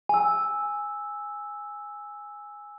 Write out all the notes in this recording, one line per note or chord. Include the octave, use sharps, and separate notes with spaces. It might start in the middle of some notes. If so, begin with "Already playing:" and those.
G#5 E6